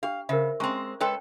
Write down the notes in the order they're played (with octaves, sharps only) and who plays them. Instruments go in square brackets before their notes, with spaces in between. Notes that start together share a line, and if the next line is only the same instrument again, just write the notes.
[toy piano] D4 G4 [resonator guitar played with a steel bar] F5
[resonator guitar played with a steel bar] C#3 [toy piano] A#4 C5 E5
[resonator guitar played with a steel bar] G#3 C4 [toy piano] C#4 A#5 C#6
[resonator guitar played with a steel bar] G#3 A4 B4 [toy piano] C#5 G5 A5